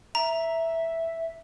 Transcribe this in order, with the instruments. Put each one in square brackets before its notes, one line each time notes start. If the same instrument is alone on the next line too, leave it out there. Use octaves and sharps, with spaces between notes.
[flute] E5 [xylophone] A#5